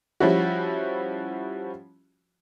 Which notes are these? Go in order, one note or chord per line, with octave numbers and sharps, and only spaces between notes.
F3 G3 C#4 E4 F#4